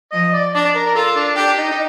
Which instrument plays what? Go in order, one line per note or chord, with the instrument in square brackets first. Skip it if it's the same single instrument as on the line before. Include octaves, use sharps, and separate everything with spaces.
[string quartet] F3 [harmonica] D#5
[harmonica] D5
[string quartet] D4 [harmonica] D5
[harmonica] A#4
A#4
[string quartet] F4 [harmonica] A4
[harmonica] D4
[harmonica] D4 [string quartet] G4
[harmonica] D#4
D#4